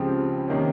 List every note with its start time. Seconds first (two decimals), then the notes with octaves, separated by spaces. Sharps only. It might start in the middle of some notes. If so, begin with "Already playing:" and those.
Already playing: C#2 C#3 F3 C4 G4
0.48 C3 D#3 A#3 C#4